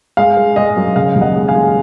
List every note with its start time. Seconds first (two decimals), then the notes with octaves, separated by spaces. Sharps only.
0.17 G#3 F5
0.37 G#3
0.56 G#3 D#5
0.77 F#2
0.96 C#3 F5
1.16 D#2
1.21 D#5 F#5
1.36 G#3
1.48 F5 G#5
1.55 G#3